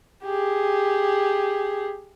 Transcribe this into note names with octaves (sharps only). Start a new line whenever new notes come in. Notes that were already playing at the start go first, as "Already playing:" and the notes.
G4 G#4